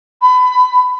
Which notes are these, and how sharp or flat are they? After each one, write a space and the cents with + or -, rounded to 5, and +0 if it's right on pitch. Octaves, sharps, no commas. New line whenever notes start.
B5 +25